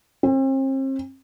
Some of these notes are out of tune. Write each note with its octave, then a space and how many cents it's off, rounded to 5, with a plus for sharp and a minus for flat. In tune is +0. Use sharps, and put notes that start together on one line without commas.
C4 +40